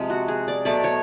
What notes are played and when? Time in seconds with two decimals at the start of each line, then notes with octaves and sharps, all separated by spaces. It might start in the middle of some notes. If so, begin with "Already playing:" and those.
Already playing: C3 F3 G#3
0.10 F#4
0.28 G#4
0.48 D5
0.65 B2 F#3 A3 D5
0.84 C#5